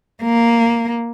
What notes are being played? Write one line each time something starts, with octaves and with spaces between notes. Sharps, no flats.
A#3